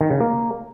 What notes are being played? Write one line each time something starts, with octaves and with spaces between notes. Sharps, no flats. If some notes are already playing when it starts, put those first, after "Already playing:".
D#3
C#3
A#3